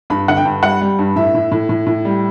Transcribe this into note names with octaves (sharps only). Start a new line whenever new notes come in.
G2 B5
D3 F#5
G5
G2
G3 F#5
G3
G2
A2 E5
A2
A2
A2
A2
G3